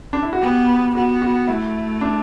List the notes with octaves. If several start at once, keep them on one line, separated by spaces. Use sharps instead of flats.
D4
E4
F#4
B3 G4
B3 F#4
F#4
A3 E4
D4